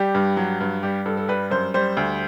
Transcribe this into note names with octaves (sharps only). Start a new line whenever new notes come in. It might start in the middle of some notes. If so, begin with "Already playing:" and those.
Already playing: G3 G4
G2
F#3
G2
G3 G4
G2 A4
A4
G3 B4
F#2 C5
G3 C5
D2